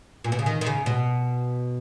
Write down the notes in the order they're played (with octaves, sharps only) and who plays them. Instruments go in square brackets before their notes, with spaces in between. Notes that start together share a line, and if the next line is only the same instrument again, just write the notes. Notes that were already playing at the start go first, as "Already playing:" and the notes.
[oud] A#2
B2
C#3
D#3
D#3
C#3
B2